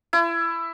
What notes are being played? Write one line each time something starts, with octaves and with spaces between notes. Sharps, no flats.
E4